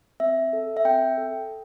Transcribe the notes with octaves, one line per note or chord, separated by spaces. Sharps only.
C4 E5
A4
E5
C4 G5
A4